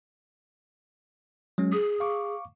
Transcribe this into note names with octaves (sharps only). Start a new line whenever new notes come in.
F#3 G#3 C#4
G#4 D#6
F5 C#6 D6